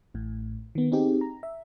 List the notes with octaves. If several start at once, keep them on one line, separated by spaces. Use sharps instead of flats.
A1 A2
D#3 B3
C4 D#4 G4 G#4
A#5
E5